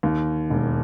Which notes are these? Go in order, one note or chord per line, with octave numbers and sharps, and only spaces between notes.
D#2
E1